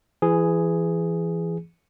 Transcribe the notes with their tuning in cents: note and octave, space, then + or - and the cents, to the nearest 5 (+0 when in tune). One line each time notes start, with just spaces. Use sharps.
E3 +30 G#4 +0